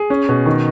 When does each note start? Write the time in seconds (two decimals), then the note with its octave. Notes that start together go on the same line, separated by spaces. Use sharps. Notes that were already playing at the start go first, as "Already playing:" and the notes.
Already playing: G#4
0.10 C#4
0.29 B2
0.46 D#3